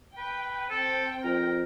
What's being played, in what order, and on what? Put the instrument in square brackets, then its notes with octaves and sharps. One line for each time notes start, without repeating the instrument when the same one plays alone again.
[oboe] B4 [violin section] G5
[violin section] C4 G5 [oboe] A4
[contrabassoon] F2 [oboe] A#4